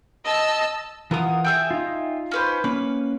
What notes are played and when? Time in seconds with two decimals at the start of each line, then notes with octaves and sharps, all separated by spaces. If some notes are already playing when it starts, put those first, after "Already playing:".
0.25 D#5 A5 E6
1.11 E3 B3 F4 A#4 D#6
1.45 G#4 E5 G5
1.71 D#4 F4
2.31 C#4 B4 C5
2.64 A#3 C#4 B4